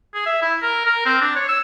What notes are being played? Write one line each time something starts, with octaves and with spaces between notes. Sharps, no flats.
G#4
E5
E4
A#4
A#4
C4
D4
C#5
E6